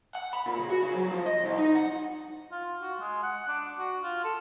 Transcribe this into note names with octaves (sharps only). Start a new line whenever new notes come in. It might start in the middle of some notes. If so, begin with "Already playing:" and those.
F#5
B5
A#2
C#3
F#4
C#3
F#3
F3
D#5
C2
D#4
F#5
F4
F#4
G#3
F#5
D4
F#4
F4
A4